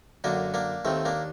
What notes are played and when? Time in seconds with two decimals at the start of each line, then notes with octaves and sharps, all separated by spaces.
0.24 F#2 D3 A#3 D4
0.54 A#3 D4
0.85 D#2 D#3 A3 C4
1.05 A#3 D4